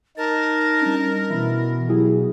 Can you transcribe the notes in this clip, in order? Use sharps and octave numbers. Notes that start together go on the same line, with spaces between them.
D#4 A#4 A5
G3 C#4 D4
B2 E3 E5 B5
F#3 E4 G4 G#4